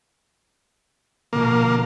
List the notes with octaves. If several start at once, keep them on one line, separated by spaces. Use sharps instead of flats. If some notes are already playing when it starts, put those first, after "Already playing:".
A#1 B2 D3 A#3